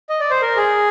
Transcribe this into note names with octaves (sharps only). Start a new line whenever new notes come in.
D#5
D5
C5
A#4
G#4